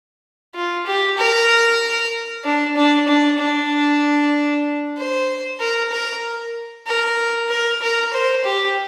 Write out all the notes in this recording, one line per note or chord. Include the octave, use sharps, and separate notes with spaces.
F4
G4
A#4
D4
D4
D4
D4
C5
A#4
A#4
A#4
A#4
A#4
C5
G4